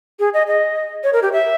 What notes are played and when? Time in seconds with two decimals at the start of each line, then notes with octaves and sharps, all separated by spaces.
0.19 G#4
0.34 D#5
0.47 D#5
1.04 C#5
1.13 A#4
1.23 G4
1.32 E5